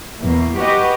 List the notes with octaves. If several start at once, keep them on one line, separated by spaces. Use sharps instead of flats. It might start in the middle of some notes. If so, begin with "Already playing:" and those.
E2 B2 A#3
F#4 G4 B4 D#5